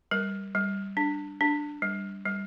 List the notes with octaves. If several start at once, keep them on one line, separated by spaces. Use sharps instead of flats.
G3 A#4
G3
D4
D4
G3
G3